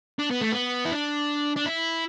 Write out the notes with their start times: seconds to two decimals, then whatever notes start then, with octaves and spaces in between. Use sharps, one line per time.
0.19 D4
0.31 B3
0.41 A3
0.52 B3
0.85 E4
0.92 D4
1.56 D4
1.65 E4